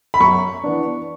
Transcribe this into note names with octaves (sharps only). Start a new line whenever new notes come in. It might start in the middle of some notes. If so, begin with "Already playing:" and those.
B5
F#2 C#6
E3 B3 D4